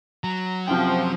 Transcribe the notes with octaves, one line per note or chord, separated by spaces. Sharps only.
F#3 A#5
F#2 C3 F3 G5